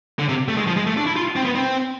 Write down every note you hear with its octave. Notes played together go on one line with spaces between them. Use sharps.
D3
C3
A3
G#3
F3
G#3
A3
D4
E4
F4
C4
B3
C4